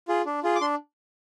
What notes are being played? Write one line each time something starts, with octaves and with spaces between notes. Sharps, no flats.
F4 G#4
D4
F4 G#4
D6
D4 C6